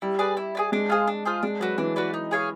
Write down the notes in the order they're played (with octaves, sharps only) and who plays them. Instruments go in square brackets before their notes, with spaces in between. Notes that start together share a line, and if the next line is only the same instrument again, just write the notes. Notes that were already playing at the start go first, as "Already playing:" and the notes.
[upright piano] G3 [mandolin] E4
[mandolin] G#4 B4 D5
E4
G#4 B4 D5
[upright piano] G#3 [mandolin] D4
[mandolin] F4 G#4 C5
D4
F4 G#4 C5
[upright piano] G#3 [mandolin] D4
[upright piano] F#3 [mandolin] F#4 B4 D5
[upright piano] E3 [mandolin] D4
[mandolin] F#4 B4 D5
D#4
G#4 C#5 F5